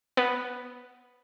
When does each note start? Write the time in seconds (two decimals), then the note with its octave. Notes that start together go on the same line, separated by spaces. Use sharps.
0.17 B3